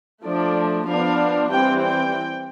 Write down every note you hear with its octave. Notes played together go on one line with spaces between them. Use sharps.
F3 A3 D4 D5
F3 B3 D4 F5
E3 G3 C4 G5
G5